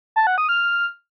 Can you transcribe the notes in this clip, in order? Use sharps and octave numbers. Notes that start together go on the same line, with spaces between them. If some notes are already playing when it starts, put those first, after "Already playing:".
A5
F#5
D#6
F6